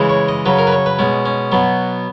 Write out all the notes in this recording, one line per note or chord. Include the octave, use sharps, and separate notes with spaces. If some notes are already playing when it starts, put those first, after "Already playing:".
Already playing: C#3 E3 G#3
C#5
D#5
C#3 F#3 B4
A#4
B4
C#5
B4
B2 G#3 C#4
C#4
B2 F#3 B3